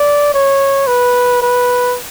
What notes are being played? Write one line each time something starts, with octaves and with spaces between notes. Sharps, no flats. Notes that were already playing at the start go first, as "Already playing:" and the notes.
Already playing: D5
C#5
B4
B4